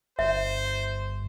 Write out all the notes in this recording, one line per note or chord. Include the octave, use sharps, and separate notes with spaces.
G1 C5 E5